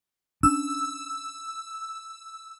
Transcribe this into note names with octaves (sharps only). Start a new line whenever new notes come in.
C#4 D4 E6